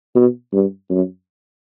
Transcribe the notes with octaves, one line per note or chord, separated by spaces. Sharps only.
B2
G2
F#2